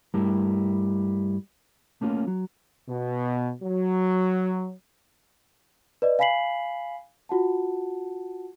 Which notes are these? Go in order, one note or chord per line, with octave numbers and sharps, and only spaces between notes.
G2 G3 A3 E4 A#4
A3 A#3 C#4 F4
F#3
B2
F#3
B4 D5 D#5
F5 G#5 B5 B6 C7 F#7
F4 F#4 F#5 A5